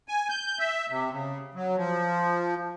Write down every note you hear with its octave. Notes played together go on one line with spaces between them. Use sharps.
G#5
G6
E5
C3
C#3
F#3
F3